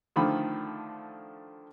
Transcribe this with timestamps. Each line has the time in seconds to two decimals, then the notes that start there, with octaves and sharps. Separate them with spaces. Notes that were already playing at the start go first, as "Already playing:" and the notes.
0.16 D3 D#3 F3 A3 B5